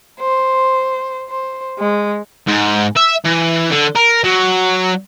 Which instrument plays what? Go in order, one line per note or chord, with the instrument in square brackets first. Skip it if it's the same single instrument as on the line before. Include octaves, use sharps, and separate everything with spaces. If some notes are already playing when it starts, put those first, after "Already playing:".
[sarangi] C5
C5
G#3
[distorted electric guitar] G#2
E5
E3
D3
A#4
F#3